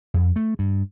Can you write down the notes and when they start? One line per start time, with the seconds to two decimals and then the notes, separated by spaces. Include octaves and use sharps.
0.14 F2
0.36 A3
0.59 G2